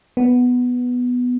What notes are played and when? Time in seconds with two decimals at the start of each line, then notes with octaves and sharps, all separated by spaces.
0.17 B3